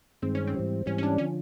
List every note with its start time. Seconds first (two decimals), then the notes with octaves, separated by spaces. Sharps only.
0.22 G2 D#3 G#3 C4
0.35 C#4
0.47 C4
0.54 G#2 E3 G3
0.86 G#2 E3 G3 C#4
0.98 C#4
1.03 D4
1.18 D3 F3 C#4